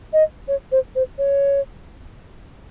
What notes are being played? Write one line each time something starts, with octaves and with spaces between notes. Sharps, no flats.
D#5
C#5
C5
C5
C#5